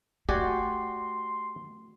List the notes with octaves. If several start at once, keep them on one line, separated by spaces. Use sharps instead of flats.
A3 F#4 G4 D5 G#5 C6